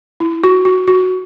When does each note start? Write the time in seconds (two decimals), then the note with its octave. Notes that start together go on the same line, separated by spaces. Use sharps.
0.20 E4
0.44 F#4
0.65 F#4
0.88 F#4